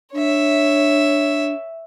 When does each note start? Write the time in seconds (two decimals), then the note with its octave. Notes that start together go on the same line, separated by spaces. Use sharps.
0.14 D4 C#5 E5